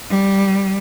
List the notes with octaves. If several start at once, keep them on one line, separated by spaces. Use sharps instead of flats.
G3